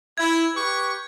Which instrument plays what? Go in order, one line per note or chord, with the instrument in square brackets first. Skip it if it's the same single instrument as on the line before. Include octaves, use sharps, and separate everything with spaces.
[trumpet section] E4 [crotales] G#6
[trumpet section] G4 B4 C#6